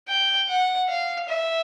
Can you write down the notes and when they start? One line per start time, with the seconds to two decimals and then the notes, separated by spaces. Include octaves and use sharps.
0.08 G5
0.49 F#5
0.89 F5
1.29 E5